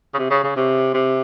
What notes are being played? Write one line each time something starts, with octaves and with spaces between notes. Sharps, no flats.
C#3
C3
C#3
C#3
C3
C3